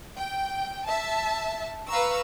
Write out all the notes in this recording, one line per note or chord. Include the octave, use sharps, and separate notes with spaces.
G5
E5 A5
B4 F5 A#5 C#6 E6